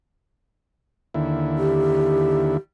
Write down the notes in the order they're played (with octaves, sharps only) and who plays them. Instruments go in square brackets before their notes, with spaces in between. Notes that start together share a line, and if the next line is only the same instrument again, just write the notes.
[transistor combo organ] D#2 D3 E4
[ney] G4